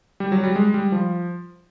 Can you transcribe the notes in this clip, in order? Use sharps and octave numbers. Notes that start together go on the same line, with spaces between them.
G3
F#3
G3
G#3
G3
F3